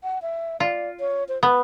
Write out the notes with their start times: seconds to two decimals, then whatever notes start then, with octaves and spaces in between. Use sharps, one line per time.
0.03 F#5
0.22 E5
0.60 F4 D5
1.00 C#5
1.29 C5
1.43 B3 B4